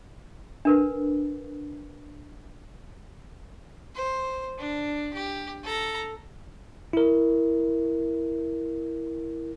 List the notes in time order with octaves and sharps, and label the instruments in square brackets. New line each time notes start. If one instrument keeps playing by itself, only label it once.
[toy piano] D4 A#4 B4
[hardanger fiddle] C5
D4
G4
A4 A#5
[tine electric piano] E4 A#4